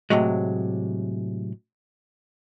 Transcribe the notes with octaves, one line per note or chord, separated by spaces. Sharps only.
A2 C3 F#3 G#3